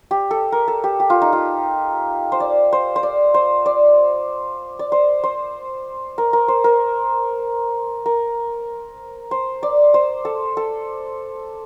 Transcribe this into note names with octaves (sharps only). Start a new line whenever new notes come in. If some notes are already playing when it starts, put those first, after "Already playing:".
G4
A4
A#4
A4
G4
G4
F4
D#4
F4
C5
D5
C5
C5
D5
C5
D5
D5
C5
C5
A#4
A#4
C5
A#4
A#4
C5
D5
C5
A4
A4